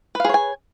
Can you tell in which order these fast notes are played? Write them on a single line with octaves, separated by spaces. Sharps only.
B4 F5 G#4 C#5 G#5